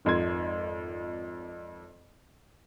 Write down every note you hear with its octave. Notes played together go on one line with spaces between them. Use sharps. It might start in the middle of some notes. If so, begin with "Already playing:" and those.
G#1 F2 C6 G#6